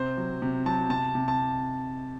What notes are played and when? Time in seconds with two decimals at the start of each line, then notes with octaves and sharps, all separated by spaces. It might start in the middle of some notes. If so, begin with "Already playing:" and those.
Already playing: C3 C5
0.17 F#3
0.42 C3
0.66 F#3 A5
0.90 C3 A5
1.15 C3
1.28 A5